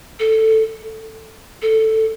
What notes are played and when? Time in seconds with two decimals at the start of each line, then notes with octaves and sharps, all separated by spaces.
0.19 A4
1.62 A4